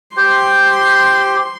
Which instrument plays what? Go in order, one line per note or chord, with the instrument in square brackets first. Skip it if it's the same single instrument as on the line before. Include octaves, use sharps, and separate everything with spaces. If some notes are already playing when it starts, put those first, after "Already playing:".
[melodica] G4 C5 G5 [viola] C6